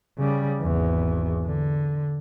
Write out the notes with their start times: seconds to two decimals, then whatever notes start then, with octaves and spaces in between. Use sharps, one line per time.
0.18 C#3 G3
0.61 G#1 E2
1.46 D3